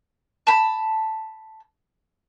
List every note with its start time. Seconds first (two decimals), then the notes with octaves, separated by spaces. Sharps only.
0.47 A5 B5